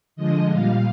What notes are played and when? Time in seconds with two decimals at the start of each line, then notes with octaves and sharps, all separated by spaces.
0.16 D3 F3 G#3 D#5
0.49 A#2 G3 F5